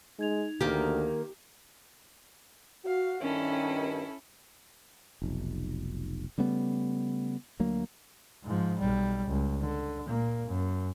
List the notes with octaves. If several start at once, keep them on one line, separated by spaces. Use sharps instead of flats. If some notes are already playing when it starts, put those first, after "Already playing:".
G#3 D#4 G#6 F7
D2 D#3 A#3 G4 A#4
F#4 F5
G2 D#3 C#4 E4 A4
F1 B1
C#3 G3 A3 B3
D2 F#3 A#3
G#2 F3
B1 G3
C#2
D3
A#2 A#3
F#2